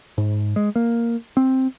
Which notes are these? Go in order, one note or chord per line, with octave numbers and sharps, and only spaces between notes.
G#2
G#3
A#3
C4